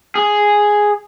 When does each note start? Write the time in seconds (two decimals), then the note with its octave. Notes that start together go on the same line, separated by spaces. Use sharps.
0.15 G#4